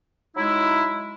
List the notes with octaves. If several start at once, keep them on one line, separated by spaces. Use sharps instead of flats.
F#3 G#3 D#4 E4